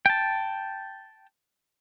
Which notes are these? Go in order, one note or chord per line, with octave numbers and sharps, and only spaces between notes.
G5 A5